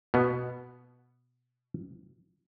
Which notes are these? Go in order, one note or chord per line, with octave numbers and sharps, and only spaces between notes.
B2 B3